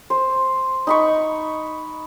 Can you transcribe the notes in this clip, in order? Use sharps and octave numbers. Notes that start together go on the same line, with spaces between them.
C5
D#4 B5 C#6